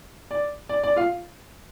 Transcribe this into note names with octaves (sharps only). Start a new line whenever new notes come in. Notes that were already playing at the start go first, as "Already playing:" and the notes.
D5
D5
D5
F4 F5